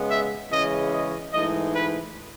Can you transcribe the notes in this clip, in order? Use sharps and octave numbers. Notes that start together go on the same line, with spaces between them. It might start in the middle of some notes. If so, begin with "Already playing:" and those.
Already playing: C#3 G#3 B3
E5
C#3 E3 G#3 C#4 D#5
D#5
G#2 E3 A3 D#5
B4